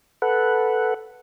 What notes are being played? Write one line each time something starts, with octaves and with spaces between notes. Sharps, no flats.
A4 B4 F#5